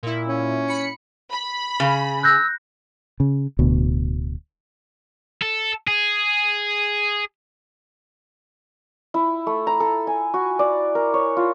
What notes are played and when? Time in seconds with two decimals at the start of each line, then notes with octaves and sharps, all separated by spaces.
0.03 A#2 E4
0.27 C#4
0.68 B5 C#7
1.31 B5
1.80 C#3
2.23 E6 F#6 G6 A#6
3.20 C#3
3.59 D1 D2 B2
5.42 A4
5.87 G#4
9.14 E4
9.47 A3
9.67 A#5
9.80 A4
10.07 G#5
10.34 F#4
10.59 D5
10.95 A#4
11.14 C#5
11.37 F4